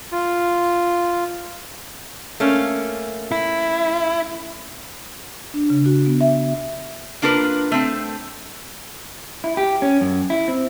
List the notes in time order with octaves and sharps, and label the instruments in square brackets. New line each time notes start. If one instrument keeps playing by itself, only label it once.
[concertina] F4
[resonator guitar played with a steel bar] A3 A#3 C#4
[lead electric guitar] E4
[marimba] D4
C#3
F#4
B3
E5
[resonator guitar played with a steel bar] A#3 D4 F4 A#4 B4
A3 C4
[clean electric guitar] E4
G4
C#4
F#2
E4
C4